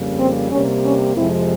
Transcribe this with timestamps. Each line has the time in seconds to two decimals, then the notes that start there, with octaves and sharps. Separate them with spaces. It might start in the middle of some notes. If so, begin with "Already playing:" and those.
Already playing: F2 C#3 G3 A#3
0.18 C4
0.50 C3 G3 A#3 C#4
0.83 C#4
1.15 F2 C3 F3 G#3 C4 E4